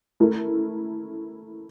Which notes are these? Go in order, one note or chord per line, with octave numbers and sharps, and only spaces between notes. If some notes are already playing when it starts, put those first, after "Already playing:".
A3 E4 A#4